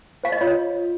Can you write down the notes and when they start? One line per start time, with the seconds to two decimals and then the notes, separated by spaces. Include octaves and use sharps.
0.24 C5 F5
0.32 D#5
0.41 F4 C#5